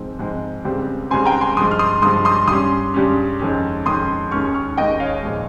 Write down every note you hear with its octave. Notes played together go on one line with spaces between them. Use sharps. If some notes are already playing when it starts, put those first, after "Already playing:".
Already playing: G#2 F3 G#3 C4
G#2 F3 G#3 C4
C#2 C#3 G3 C4
C#2 C#3 G3 C4 G#5 C6
G5 A#5
G#5 C6
G2 F3 G#3 C6 D#6
F6
C6 D#6
G2 F3 G#3 C6 D#6
C6 D#6
G2 G3 C#4 C6 D#6
G2 G3 C#4
F2 D#3 G#3 C#4
F2 D#3 G#3 C#4 C6 D#6
D#2 D#3 G#3 C#4 C#6 F6
C#6 F6
D#2 D#3 G#3 C#4 D#5 G5
C#5 F5
A#2 F3 G#3